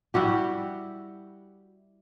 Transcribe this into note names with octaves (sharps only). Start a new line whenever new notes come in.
G3 E4 F#4 G4